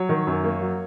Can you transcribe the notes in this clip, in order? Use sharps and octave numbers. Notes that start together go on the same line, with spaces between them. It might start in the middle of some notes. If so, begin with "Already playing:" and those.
Already playing: F#3 C#5
D#3
F#2
A#3
F#3